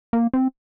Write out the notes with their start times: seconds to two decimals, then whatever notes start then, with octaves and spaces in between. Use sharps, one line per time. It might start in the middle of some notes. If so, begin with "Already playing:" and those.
0.13 A#3
0.34 C4